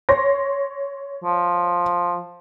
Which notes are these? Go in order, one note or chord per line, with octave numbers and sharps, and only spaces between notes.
C#5 C6 A#6
F3